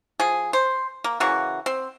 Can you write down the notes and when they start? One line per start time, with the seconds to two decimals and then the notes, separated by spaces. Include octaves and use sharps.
0.20 F3 G#4
0.53 C5
1.04 A#3
1.20 C#3 E3 A#3 F#4
1.66 C4